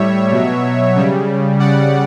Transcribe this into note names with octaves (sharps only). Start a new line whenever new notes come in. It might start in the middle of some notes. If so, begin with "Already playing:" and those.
Already playing: A2 G3 C#5 E5
B2 F#3
C#3 G3
C#3 G3 D5 F#5